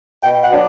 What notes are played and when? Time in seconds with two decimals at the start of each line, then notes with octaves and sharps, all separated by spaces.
0.22 B2 G5
0.41 F#5
0.50 F#3 B3 D4